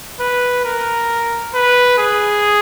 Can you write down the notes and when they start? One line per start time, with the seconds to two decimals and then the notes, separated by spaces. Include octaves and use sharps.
0.20 B4
0.65 A#4
1.54 B4
1.99 G#4